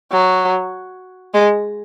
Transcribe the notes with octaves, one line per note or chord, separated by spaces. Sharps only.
F#3
G#3